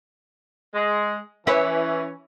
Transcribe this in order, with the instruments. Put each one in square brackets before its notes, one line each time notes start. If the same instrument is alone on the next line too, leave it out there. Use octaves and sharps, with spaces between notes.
[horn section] G#3
[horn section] E3 C#4 [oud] E4 B4 C#5